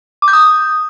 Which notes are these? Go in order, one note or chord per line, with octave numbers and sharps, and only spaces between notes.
D6
G6
D#6